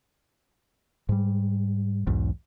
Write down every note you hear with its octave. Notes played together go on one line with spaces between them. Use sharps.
G#2 G3
B1 E2 G#2